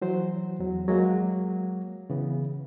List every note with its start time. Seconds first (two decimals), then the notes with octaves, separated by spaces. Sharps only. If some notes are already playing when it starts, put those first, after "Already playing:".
0.02 E3 F#3 C5
0.59 E2 F#3
0.88 F#3 G#3 A#3
2.10 C#3 E3 B3